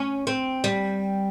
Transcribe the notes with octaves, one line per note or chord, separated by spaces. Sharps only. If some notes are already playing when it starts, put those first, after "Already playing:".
Already playing: C#4
C4
G3